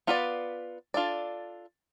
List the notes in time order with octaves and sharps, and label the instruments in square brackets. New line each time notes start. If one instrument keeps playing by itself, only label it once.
[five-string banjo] B3 F4 B4 D5
D4 F4 A4 D5